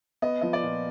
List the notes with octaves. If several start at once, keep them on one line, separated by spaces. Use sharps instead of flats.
B3 D#5
F3 D#5
D5
A#2